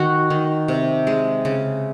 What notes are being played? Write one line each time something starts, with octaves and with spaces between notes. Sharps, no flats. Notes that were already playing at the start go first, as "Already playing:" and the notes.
Already playing: D#3 F#4
D#3
C3
G#3
C#3